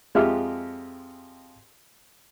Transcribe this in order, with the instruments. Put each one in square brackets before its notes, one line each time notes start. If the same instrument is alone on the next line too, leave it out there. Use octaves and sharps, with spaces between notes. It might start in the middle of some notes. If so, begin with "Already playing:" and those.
[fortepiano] F2 G#3 F4 G4 E5 F6